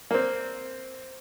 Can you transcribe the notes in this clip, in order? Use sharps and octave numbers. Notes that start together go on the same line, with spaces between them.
A#3 C4